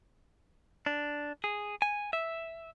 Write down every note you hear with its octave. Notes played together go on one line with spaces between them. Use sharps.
D4
G#4
G#5
E5